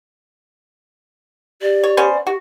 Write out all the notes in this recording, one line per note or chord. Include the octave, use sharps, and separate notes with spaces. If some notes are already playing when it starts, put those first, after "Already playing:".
G4 D5
C#5
B3 C#4 C5
F#4 G4